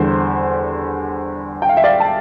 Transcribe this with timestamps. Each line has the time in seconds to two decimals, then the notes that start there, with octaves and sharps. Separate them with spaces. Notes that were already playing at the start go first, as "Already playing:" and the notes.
Already playing: E2 D3 G3 C5
1.62 G5
1.69 F5
1.77 E5
1.84 D5 F5
2.00 A5